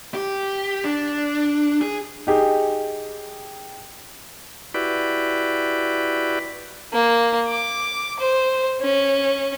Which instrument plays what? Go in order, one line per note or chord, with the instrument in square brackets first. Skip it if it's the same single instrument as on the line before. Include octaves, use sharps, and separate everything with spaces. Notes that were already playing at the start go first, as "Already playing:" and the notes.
[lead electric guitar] G4
D4
G#4
[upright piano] D#4 G4 G#4
[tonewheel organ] E4 F#4 G4 B4 D5
[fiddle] A#3
D6
C5
C#4